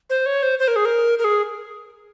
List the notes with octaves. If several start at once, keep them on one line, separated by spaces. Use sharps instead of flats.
C5
C#5
C5
C5
A#4
G#4
A#4
A#4
G#4